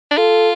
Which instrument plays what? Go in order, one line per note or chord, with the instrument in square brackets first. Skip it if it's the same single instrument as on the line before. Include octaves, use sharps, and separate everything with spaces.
[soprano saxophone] D4
[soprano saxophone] F4 [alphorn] A4